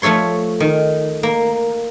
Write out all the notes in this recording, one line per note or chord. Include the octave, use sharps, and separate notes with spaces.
F3 A3 A4 C#5 C6
D#3
A#3